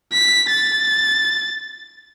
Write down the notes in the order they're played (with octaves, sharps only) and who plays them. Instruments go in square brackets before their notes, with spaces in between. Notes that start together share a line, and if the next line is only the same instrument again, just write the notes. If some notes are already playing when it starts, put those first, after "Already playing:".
[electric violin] B6
A6